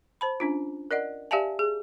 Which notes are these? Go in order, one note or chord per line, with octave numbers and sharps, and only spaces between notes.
C5 A5 B5
C#4 D4 F4
A#4 D5 D#5 F#5
G4 D5 E5 F5 G#5 A5
G#4